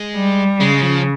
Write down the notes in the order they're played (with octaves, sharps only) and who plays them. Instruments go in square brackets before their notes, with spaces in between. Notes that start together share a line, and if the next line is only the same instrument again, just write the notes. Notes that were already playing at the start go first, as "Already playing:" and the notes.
Already playing: [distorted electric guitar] G#3
[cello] G3
[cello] C#3 [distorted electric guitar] G#3
[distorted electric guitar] F3